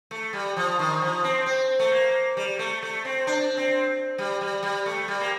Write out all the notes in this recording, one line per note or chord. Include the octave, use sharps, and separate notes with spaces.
A3
G3
F3
D#3
F3
C4
C4
A3
A#3
G3
A3
A3
C4
D4
C4
G3
G3
G3
A3
G3
A#3